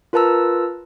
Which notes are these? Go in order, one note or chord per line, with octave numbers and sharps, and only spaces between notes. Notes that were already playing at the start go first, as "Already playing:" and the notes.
F4 A#4 B4 A5 A#5 E6